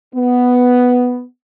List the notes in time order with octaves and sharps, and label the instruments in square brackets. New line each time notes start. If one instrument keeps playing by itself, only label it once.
[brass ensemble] B3